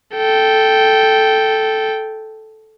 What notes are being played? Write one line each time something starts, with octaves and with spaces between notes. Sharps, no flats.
A4 G5